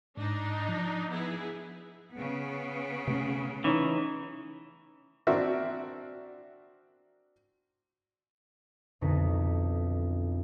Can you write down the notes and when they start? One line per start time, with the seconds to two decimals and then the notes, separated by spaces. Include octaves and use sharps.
0.17 G#2 D4 D#4
0.69 F3
1.10 B3 E4 G#4
2.12 C#3 B3
3.08 C3 A3 C#4
3.64 E3 C#4 D#4 C#5 A#5
5.27 C4 D4 F#4 A#4 E5
9.01 B1 F2 D3 D#4 B6 C#7